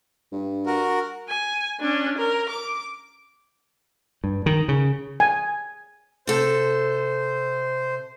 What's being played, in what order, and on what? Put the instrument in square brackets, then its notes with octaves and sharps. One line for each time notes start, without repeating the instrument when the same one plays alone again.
[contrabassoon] G2
[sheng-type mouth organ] F#4 A#4
[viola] G#5
C#4 D4
A#4
D6
[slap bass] G2
D#3
C#3
[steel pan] G#5
[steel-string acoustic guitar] C3 A4 [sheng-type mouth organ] C5